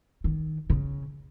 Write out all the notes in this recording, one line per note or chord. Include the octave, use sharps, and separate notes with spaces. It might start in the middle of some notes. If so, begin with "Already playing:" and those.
D#3
C#3